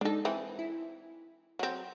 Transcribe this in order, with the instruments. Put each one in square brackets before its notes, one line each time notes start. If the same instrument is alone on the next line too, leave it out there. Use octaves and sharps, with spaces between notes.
[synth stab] G#3 D#4 [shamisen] D4 A4
[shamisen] E3 C4 [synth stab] B4
[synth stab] E4
[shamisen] F#3 C4